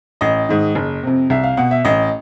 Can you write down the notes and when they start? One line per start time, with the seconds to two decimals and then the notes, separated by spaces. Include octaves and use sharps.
0.21 A1 D#5
0.49 G#2 D#3
0.75 F#1
1.03 F2 C3
1.30 C2 E5
1.44 F5
1.57 B2 F#5
1.71 E5
1.85 A1 D#5